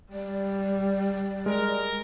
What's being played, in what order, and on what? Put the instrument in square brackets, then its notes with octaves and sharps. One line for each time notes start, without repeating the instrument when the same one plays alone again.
[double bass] G3 [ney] D5
[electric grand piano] G#3 [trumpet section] A#4